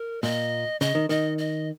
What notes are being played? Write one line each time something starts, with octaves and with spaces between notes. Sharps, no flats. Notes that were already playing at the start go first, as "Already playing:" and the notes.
Already playing: A#4
A#2 D#5
C#3 D#5
D#3
D#3 D#5
D#5